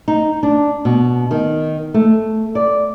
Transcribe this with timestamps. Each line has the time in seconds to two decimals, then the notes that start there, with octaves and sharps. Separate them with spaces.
0.08 D#4
0.43 D4
0.85 B2
1.31 D#3
1.94 A3
2.55 D5